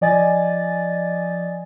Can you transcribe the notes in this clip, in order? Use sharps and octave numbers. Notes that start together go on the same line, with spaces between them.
F3 D5 D#5 G#5 A6